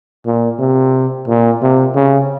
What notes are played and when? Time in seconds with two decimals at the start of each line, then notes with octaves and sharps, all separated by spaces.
0.26 A#2
0.59 C3
1.28 A#2
1.62 C3
1.95 C#3